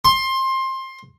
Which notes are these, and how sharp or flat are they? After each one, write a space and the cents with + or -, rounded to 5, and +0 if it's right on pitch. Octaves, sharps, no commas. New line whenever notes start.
C6 +20